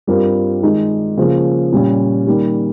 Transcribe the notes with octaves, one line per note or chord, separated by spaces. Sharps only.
G2 G3 C4 F4 A#4
D#3 G#3 D#4
C#3 F3 A#3
A#2 G3 C#4
D#3 G3 A#3